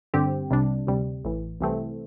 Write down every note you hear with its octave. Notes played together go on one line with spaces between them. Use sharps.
G2 D3 C4 G4
C2 C3 G3 D4
D2 C3 G3
A1 A2 E3
C2 C3 E3 A3 C4